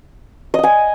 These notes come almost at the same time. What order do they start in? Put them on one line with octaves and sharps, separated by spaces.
D#5 D#6 G#5